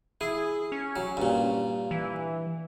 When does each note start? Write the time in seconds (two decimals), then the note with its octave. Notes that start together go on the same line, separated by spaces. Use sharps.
0.21 E4 G#4
0.72 C#4
0.96 F#3
1.17 G2 A#2
1.91 E3